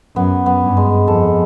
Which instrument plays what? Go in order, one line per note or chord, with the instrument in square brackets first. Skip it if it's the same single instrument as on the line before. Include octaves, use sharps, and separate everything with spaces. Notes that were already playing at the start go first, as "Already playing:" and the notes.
[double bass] F#2 [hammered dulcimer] B3
[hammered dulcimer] B3
[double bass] G2
[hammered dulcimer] G#3
[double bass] F2 [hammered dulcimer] A4